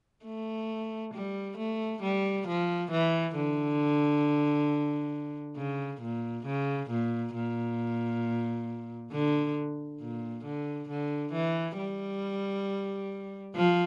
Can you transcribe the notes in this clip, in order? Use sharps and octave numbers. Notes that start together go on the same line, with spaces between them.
A3
G3
A3
G3
F3
E3
D3
C#3
A#2
C#3
A#2
A#2
D3
A#2
D3
D3
E3
G3
F3